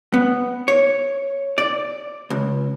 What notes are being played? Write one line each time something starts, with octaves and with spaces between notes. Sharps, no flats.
B3
C#5
D5
C#2